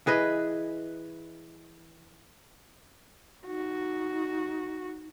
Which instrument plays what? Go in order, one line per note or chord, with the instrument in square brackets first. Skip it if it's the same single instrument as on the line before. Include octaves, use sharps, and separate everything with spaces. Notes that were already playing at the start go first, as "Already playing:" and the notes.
[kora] E3 G#4 B4 D#5
[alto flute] D#4 [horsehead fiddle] F#4